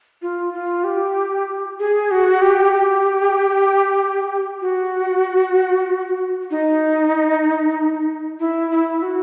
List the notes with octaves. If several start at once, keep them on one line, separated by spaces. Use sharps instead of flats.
F4
F4
G4
G#4
F#4
G4
G4
F#4
D#4
E4
E4
F#4